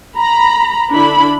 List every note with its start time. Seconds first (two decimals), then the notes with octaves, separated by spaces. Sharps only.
0.19 A#5 B5
0.93 D3 D4 E4 B5